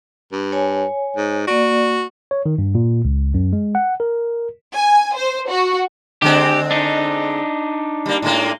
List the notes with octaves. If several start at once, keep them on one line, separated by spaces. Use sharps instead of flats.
G2
C#5 G#5
G#2
A#3 F#4 D5
C#5
D#3
G2
A#2
C#2
F#2
G#3
F#5
A#4
G#5
C5
F#4
D3 G#3 C4 G4
D4 D#4
G3 A#3
A2 G#3 A#3